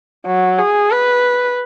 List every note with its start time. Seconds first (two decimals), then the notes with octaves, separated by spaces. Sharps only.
0.26 F#3
0.59 G#4
0.91 B4